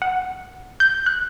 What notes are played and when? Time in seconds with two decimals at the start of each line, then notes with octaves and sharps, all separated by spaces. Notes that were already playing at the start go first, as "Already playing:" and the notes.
0.02 F#5
0.80 G6
1.06 F#6